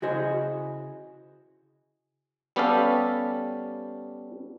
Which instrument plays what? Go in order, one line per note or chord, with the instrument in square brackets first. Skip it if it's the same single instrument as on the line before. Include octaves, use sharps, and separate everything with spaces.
[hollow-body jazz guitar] C#3 E4 F#4 G#4 C5 D#5
[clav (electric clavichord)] G3 B3 C#4 G4 A4 F5